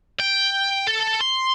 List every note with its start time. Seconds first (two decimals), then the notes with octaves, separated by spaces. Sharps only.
0.20 G5
0.87 A4
1.20 C6